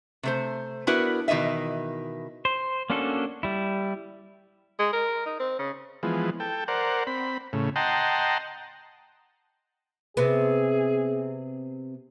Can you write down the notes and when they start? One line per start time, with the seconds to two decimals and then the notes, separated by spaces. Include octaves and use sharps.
0.23 C3 A3 C5
0.87 B3 D4 E4 F#4 A#4 B4
1.28 B2 D#3 E3 D#5 E5
2.45 C5
2.90 A#3 C#4 D4 F#4 A4
3.43 G3 E4
4.79 G#3
4.93 A#4
5.26 D#4
5.40 C4
5.59 C#3
6.03 E3 F3 G#3 B3
6.40 A4 G5
6.68 A#4 C5 D5 F#5
7.07 C4 B5
7.53 A2 C#3
7.76 D#5 F#5 G5 A5 A#5 C6
10.17 C3 B3 G#4